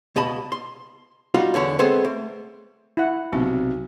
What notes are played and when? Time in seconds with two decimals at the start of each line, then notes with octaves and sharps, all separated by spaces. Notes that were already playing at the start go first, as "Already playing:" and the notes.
0.16 C#2 B2 D#5 A5 B5
0.52 C6
1.34 G3 D#4 F4 F#4
1.54 E2 D3 C#4 D4
1.79 G#3 B3 C4 G#4 A4 C5
2.05 A3
2.97 E4 F#5
3.32 B1 C3 F#3 B3 D#4